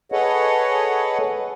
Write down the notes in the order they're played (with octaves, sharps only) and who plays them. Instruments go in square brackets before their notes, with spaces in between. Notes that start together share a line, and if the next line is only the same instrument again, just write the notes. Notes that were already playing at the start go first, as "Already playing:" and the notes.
[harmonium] G#4 A4 B4 C#5 D#5 F#5